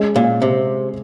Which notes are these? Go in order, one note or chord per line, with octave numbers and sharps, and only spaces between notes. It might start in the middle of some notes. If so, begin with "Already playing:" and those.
Already playing: G#3 C#4 G#4 D#5
A#2
C3